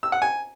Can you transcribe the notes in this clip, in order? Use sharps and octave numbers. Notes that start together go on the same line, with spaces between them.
E6
F#5
G#5